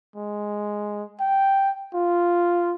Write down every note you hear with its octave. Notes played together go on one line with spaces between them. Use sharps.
G#3
G5
F4